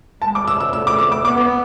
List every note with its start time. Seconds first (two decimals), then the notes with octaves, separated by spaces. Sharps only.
0.22 G#3 A5
0.35 D6
0.47 E6
0.60 E6
0.73 A3 E6
0.87 D6
0.99 E6
1.12 D6
1.25 B3 D6